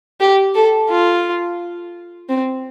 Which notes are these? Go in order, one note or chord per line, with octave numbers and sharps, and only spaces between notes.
G4
A4
F4
C4